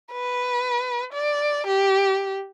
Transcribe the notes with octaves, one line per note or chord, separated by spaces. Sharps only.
B4
D5
G4